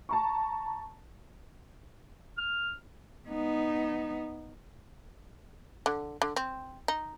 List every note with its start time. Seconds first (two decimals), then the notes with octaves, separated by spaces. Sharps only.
0.09 A5 A#5 C#6
2.38 F6
3.29 B3 D#4
5.86 D3
6.22 D3
6.36 C4
6.88 D#4